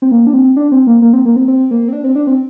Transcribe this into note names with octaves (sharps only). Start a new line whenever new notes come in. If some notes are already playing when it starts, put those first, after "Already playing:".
C4
A#3
D4
C4
D4
C4
A#3
A#3
C4
A#3
C4
C4
A#3
C4
D4
C4
D4
C4